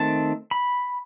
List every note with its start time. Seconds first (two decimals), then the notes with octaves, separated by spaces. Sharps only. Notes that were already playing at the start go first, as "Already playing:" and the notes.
Already playing: D#3 A3 C4 A5
0.51 B5